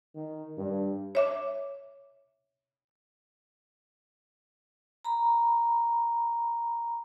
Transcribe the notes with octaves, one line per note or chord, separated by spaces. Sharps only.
D#3
G2
C#5 E5 D6
A#5 B5